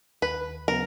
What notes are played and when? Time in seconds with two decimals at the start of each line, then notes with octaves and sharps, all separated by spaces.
0.22 D#2 B4
0.68 C#3 F#3 B3 A#4